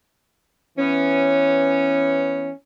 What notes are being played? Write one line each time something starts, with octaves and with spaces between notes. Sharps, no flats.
E3 B3 C#4